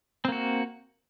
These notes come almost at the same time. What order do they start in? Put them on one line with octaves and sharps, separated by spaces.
C4 A#3 F#4